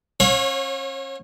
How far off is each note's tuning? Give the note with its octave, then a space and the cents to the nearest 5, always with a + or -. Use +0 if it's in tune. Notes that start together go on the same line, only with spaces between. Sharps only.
C#4 -40 C#5 -15 F5 +45